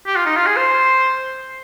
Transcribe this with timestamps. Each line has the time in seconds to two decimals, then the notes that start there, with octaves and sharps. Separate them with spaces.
0.07 G4
0.16 F4
0.26 D#4
0.37 F4
0.47 G#4
0.57 C5